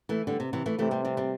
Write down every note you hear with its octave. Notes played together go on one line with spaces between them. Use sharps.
E3 A3
D3 G3
C3
C3 E3
E3 A3
C3 E3 A3
G3 C4
G3 C4
G3 C4